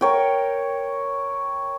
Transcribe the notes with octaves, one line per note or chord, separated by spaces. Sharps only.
A#4 C#5 G5